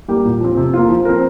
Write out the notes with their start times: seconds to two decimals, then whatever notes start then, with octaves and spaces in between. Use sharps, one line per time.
0.08 G3 A#3 G4
0.25 A#2
0.41 F3 C4
0.57 C3
0.74 A#3 F4
0.89 F3
1.05 C4 A#4